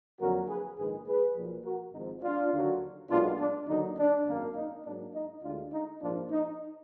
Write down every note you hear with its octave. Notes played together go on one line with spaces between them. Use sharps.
F2 D3 F#3 A#3 F#4 A#4
G#4 B4
A#1 G#2 D#3 G#3 G#4 B4
G#4 B4
B1 A#2 F3
F#4 A#4
G#1 G#2 F3 D#4
D4 F4
D#2 D3 F#3
B1 A#2 G#3 B3 D4 F4
D4
D#2 D3 F#3 D#4
D4
G#1 F#2 D#3 A#3
D#4
G#2 F#3 A#3 D4
D#4
D2 D3 G#3 D4 F4
D#4
A#1 G#2 F3 A#3 D4 F4
D#4